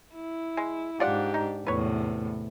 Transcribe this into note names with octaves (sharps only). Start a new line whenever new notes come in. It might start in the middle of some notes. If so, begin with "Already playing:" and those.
E4
G#3
G#2 D4 F4 G4 D5 F#5
D#4
E2 A2 C3 B4 C#5